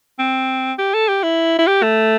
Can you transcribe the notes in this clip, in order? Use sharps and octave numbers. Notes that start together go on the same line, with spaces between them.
C4
G4
A4
G4
E4
E4
G4
A3